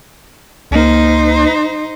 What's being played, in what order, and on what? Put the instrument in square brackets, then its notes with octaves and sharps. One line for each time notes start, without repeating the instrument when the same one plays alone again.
[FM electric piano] C#2 A#3 [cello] D#4 C5